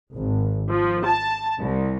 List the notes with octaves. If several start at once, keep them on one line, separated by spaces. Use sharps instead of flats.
G#1
F3
A5
C2